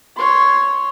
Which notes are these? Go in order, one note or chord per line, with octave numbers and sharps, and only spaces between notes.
C#5 C6